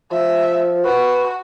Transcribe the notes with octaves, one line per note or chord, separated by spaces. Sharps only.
F3 E5
F#4 B4